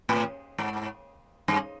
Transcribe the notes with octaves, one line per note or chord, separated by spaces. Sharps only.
A2
G#2
G2